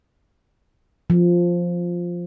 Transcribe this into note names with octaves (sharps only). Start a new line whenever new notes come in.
F3